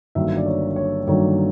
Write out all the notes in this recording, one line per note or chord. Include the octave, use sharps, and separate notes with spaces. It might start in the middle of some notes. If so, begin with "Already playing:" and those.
G1 G2 D#3 F#3 A#3 E5
D5
C#5
C#5
G1 G2 D#3 F#3 A#3 C#5